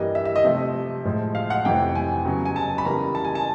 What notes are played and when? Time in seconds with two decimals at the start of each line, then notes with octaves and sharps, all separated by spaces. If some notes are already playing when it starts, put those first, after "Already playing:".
Already playing: G2 E3 G3 A#3 D#5
0.15 E5
0.25 E5
0.36 D#5
0.45 C3 F3 A3 E5
1.05 A2 F3 G#3
1.35 F5
1.50 F#5
1.65 F2 C3 E3 A3 G5
1.95 G#5
2.25 C#3 F#3 B3
2.45 G#5
2.56 A5
2.78 B5
2.85 C#3 E3 G3 A#3 A#5
3.15 A5
3.25 G#5
3.35 A5